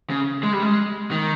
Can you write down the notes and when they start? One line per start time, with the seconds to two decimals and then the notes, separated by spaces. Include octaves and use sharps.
0.10 C#3
0.43 G#3
0.53 G3
0.63 G#3
1.11 D#3